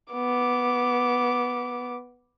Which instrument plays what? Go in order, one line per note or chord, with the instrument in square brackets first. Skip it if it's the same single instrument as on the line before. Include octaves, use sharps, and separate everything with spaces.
[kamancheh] B3 D6